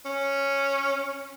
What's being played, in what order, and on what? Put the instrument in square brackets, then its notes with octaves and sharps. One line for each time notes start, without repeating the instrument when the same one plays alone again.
[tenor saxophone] C#4